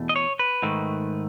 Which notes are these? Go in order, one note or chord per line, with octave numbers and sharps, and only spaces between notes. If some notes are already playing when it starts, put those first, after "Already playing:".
Already playing: E2 B2 A3
D#5
C#5
B4
G#2 D#3 A3